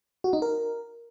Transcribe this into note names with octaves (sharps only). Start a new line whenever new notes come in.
F#4
D#4
A#4